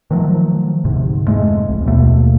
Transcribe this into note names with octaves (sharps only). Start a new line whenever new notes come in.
D#3 F3 F#3 A3
D2 G#2 C3
F2 G#3 A3
C2 F2
D#2 B2 A3 A#3